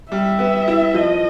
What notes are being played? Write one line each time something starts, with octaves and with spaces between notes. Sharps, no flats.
G3 E5
B3
E4
F3 D#5